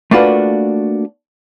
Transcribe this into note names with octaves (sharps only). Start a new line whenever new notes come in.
A3 A#3 D4 F4 F#4 B4